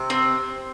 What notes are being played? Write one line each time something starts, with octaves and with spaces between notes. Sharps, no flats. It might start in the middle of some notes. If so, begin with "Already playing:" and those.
Already playing: C3
C4